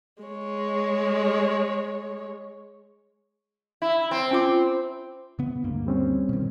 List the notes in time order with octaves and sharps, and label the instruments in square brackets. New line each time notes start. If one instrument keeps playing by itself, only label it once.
[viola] G#3 C#5
[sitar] E4
C4
[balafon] C#4 F4 D6
[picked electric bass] C#3 B3
D2 G2 A#3
[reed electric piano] G3 C4 C#4
[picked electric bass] B2 D#3